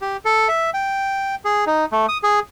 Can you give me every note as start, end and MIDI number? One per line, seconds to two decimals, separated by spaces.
0.01 0.17 67
0.25 0.48 69
0.48 0.70 76
0.74 1.35 79
1.45 1.65 68
1.67 1.86 63
1.92 2.06 57
2.09 2.18 87
2.23 2.40 68